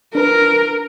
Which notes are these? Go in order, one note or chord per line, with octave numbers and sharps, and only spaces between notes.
D4 A#4 B4